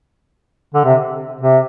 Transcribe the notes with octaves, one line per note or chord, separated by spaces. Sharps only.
D3
C3
C3